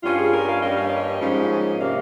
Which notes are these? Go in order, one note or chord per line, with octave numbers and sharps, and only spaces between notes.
G2 G3 C#4 F4
G#4
A#4
F5
G2 G3 A#3 C#4 D#5
F5
D#5
G#2 F3 A#3 C#4
C3 G3 A#3 C#4 F5